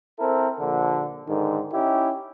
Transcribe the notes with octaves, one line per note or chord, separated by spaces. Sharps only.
C4 E4 A4 A#4
A#1 D3
G#2 D3 D#3
C#4 D#4 E4 G4